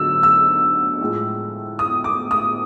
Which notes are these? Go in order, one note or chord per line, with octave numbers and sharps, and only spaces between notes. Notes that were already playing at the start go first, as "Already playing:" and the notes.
Already playing: D3 F#3 E6
E6
A2 F3 G#3
D#6
D6
D#6